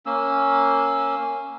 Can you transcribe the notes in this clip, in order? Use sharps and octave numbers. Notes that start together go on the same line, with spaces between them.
A#3 C#4 E6